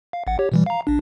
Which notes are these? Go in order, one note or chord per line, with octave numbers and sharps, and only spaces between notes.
F5
A1 F#5
G4 C#5
B2 E3 G3
F5 A#5
A#1 D4